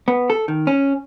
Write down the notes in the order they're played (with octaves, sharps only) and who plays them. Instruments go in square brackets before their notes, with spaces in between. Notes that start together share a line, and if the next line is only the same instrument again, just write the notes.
[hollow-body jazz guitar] B3
A4
D#3
C#4